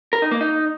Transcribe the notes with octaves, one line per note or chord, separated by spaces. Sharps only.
A#4
D#4
A#3
D#4